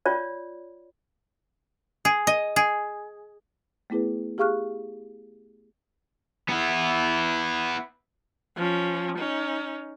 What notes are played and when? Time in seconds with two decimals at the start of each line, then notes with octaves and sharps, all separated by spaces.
0.06 F4 C#5 D5
2.05 G#4
2.27 D#5
2.56 G#4
3.90 A3 B3 E4 G#4 B4
4.38 G4 G#4 F5 C#6 F6 F#6
6.49 B3 E4
8.57 F3 C#4
9.18 C#4 D#4